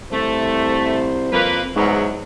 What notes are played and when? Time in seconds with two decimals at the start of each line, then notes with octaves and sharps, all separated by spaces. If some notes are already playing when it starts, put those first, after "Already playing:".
0.12 C2 A3 C5
1.33 F2 A#3 B4
1.76 E2 G#2 F#3